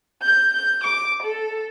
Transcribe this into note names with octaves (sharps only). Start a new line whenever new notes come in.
G6
G6
D6
A4